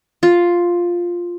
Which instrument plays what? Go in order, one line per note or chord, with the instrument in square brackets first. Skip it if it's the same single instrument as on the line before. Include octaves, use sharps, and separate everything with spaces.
[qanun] F4